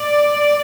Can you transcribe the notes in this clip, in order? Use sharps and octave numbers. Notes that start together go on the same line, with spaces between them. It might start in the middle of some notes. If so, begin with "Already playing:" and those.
Already playing: D5